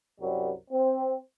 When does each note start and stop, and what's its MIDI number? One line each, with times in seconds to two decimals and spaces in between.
0.20 0.51 36
0.20 0.51 42
0.20 0.51 54
0.20 0.51 55
0.71 1.15 60